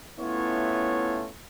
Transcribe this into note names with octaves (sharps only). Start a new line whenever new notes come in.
A3 B3 C#4 E4 F4 C#5